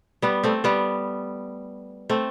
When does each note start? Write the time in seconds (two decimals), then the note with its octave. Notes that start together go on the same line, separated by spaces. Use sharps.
0.22 G3 B3
0.44 A3 C4
0.64 G3 B3
2.10 A3 C4